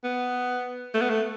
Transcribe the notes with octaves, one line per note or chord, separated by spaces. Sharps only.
B3
A3
B3
A3